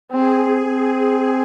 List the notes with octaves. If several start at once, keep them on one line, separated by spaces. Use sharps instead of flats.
C4 G#4
C4 G#4